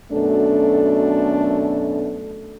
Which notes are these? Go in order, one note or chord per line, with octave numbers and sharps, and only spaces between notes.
F#2 B2 A3 D4 A4